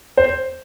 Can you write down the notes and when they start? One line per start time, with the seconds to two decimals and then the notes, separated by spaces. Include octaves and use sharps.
0.17 C5